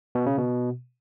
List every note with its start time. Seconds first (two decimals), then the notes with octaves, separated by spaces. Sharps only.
0.15 B2
0.26 C#3
0.38 B2